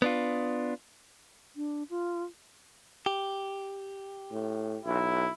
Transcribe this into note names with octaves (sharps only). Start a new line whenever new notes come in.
B3 D4 F4
D4
F4
G4
A2
B1 E4